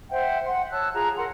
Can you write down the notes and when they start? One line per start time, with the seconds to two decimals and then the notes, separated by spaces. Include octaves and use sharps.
0.10 C5 E5 F#5 G5
0.46 F#5 C6
0.71 C#5 A5 E6 F#6
0.93 F4 G#4 A#5
1.17 A#4 F#5 C6